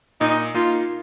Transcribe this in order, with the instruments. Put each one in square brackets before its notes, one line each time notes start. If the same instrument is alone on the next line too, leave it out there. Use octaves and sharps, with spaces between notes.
[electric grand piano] A#2 [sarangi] D#4
[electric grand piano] A#3 D#4 [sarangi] F4